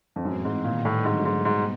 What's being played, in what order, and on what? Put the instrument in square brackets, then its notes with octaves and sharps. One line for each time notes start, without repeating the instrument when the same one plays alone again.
[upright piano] F2
[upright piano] F#2 [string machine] A2 E3 G#3 C4
[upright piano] G#2
[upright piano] A#2 [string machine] D#3 G3 B3 D#4
[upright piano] A2
[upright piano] G#2 [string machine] D3 F#3 A3
[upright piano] G#2
[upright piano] G#2 [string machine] B2 G3 B3